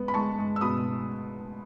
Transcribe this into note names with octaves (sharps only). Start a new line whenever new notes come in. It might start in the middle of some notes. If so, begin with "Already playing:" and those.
Already playing: G#3 B3
B5
G#3 A5 C#6
G#3
E6
B2 B5 D#6